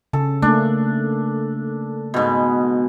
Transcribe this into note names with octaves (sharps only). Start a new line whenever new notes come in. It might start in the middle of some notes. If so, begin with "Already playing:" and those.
C#3 A4
A3 A#3 D4
G#2 B2